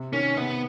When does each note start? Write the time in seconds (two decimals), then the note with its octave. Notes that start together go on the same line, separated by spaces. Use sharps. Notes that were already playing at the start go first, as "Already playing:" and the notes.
Already playing: C3
0.13 D#3 C#4
0.37 C3 B3